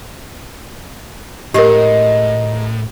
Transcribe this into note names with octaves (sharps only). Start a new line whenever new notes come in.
A2 G#3 D#4 G4 A#4